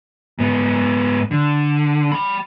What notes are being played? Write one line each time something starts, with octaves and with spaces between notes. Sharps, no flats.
G#2 B3
D3
G5 B5